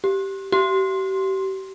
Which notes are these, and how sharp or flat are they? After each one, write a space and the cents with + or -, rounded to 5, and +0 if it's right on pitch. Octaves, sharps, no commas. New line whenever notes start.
G4 -10
G4 -35